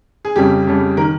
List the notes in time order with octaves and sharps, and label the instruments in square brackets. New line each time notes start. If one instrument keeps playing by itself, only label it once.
[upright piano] G#4
F2 C#3 G3 G4
F2 C#3 G3
D#3 A#4